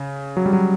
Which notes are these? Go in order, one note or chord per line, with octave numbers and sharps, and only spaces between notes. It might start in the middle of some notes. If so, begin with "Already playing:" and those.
Already playing: C#3
F#3
G3
F#3